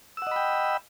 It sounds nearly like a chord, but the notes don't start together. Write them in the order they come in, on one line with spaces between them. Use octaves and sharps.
E6 F#5 D#5 B5 G5